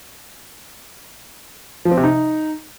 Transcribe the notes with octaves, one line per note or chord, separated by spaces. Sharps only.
F3
C4
C3
D#4